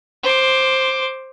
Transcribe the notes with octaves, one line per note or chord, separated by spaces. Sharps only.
C5 D6